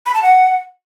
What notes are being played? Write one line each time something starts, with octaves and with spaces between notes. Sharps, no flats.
B5
A5
F#5